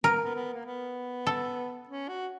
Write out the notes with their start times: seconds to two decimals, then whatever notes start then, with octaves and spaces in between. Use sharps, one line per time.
0.04 B3 A#4
0.14 A#3
0.24 B3
0.35 B3
0.53 A#3
0.66 B3
1.27 A4
1.88 C#4
2.08 F#4